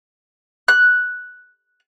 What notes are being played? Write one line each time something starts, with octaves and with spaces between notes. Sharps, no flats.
F#6